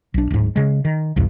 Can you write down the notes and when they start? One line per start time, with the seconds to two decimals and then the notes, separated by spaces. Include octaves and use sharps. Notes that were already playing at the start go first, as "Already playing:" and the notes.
0.14 B1 D4
0.31 D1 G#2
0.56 C#3 G#3
0.85 D#3
1.16 B1 E2 G2